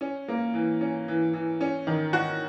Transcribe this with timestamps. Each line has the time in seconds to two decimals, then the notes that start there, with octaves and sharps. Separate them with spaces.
0.01 C#4
0.28 A#3
0.54 E3
0.81 C#4
1.08 E3
1.33 E3
1.61 C#4
1.87 D#3
2.13 F#4